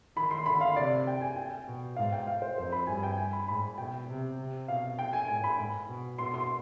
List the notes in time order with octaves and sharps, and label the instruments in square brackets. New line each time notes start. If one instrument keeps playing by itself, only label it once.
[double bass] D#3 [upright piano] B5
[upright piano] C6
[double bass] D3 [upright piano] B5
[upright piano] F5
[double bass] C3 [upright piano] D5
[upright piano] G5
G#5
G5
[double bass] B2
[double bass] G#2 [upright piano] F5
[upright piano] G5
F5
C5
[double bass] F2 [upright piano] C5
[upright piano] B5
[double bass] G2 [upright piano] G#5
[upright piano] G5
G#5
B5
[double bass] G#2 [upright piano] B5
[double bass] B2 [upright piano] G5
[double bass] C3
C3
[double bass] B2 [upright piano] F5
[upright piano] G5
G#5
[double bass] G#2 [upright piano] G#5
[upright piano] B5
[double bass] G#2
B2
[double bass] B2 [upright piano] C6
[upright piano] C6